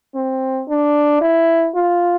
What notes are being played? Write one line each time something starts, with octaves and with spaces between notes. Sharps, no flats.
C4
D4
E4
F4